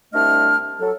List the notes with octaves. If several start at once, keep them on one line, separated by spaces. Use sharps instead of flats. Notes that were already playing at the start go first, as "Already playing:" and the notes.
C2 A3 D4 D#5 F6
F#3 A4